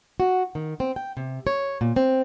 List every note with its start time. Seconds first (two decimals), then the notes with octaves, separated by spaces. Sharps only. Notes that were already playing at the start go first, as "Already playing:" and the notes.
0.20 F#4
0.55 D#3
0.80 C4
0.96 G5
1.17 C3
1.47 C#5
1.81 A#2
1.96 C4